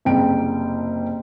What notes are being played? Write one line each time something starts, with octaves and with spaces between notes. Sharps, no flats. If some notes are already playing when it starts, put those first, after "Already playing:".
F#1 C2 G5 D7